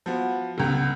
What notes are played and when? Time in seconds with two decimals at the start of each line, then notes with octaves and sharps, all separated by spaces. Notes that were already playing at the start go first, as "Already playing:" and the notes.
0.06 F3 B3 F#4
0.58 F1 C#2 B3